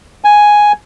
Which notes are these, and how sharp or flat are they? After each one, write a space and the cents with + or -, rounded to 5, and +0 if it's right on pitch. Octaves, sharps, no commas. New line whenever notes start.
G#5 +0